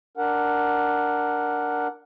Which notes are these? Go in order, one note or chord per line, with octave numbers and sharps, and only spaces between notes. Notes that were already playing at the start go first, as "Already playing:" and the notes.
D4 A#4 F#5